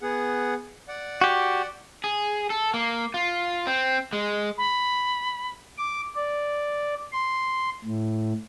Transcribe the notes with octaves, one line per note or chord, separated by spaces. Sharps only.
B3 G#4 F#5
D5 F#5
F#4 G4
G#4
A4
A#3
F4
C4
G#3
B5
D6
D5
C6
A2